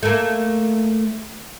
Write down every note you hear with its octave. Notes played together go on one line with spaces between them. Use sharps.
A3 A#3